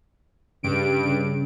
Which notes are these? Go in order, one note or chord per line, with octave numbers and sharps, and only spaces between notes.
G2 C#3 D7
C#3